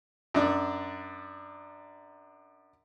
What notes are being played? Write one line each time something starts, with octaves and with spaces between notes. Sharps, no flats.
F#2 D4